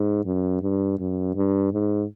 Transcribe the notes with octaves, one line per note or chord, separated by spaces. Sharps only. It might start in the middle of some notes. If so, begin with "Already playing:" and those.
Already playing: G#2
F#2
G2
F#2
G2
G#2